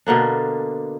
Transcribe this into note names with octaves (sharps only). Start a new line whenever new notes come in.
B2 D3 A#3 D4